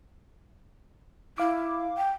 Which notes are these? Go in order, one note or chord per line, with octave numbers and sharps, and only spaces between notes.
E4 F5 D6
G5